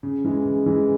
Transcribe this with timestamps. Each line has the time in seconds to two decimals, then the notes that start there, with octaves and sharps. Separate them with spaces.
0.03 C#3
0.25 E3 G#3
0.45 C#3
0.66 E3 G#3